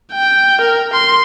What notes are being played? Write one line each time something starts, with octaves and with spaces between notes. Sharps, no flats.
G5
A#4
C6